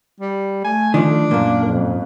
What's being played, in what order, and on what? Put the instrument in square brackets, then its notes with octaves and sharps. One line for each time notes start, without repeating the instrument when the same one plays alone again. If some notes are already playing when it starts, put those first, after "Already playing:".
[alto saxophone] G3
[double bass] A3 [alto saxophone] G#5
[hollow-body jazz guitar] D#3 F3 [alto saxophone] D4
[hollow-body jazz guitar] F#2 A#2 [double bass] A#3
[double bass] F2 G#2